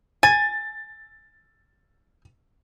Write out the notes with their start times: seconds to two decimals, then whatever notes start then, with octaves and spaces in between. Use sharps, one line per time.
0.23 G#5 A6